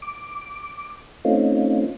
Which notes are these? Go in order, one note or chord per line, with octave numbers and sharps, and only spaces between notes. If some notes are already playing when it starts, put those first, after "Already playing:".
D6
A3 C4 C#4 D#4 F4